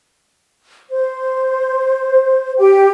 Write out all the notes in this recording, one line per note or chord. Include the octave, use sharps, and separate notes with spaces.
C5
G4 G5